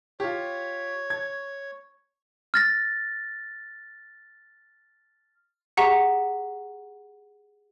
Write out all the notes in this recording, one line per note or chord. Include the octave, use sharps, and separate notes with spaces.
F4 G4 C#5
G#6
F6 A6 A#6
G4 G#4 F#5 A#5 C#6 B6